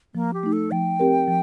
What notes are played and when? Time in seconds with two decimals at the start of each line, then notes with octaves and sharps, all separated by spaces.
0.14 F3 A#3
0.34 G4
0.43 A3 D#4
0.53 A4
0.71 F3 G5
1.00 C4 G4 A#4
1.28 F3